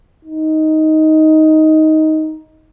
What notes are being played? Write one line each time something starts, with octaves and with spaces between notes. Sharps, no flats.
D#4